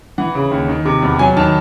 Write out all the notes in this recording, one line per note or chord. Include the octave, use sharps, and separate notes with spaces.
E3 F#5
C#3
D#2
D#3
C3
E2
F#3 G#5
D#3 A5